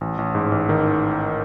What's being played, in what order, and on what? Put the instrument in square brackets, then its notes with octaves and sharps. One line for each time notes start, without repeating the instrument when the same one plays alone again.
[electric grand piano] A1
A1
G#2
A1
D#3